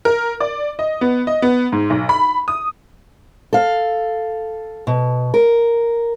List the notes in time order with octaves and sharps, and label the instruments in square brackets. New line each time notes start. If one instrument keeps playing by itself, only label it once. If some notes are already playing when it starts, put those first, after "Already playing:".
[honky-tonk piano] A#4
D5
D#5
B3
D#5
B3
G#2
B1
B5
D#6
[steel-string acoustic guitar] A4 F5
B2
A#4